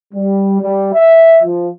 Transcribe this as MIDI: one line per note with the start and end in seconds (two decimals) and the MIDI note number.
0.13 0.60 55
0.61 0.89 55
0.94 1.38 76
1.43 1.68 53